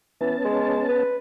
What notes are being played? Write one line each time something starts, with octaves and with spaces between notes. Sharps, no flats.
E3 B3 C#4 A5
G#3
B4